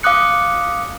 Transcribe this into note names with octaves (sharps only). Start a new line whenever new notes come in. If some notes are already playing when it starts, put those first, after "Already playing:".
F5 D6 D#6 F#6 C#7